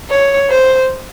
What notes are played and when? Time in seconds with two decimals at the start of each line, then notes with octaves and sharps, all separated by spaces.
0.10 C#5
0.50 C5